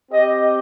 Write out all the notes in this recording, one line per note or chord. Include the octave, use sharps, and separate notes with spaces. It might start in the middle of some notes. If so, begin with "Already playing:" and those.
C4 G4 D#5